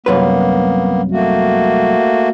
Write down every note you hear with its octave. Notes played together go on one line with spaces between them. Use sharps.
C2 F#2 A#3 B3 B4
A3 A#3 F#4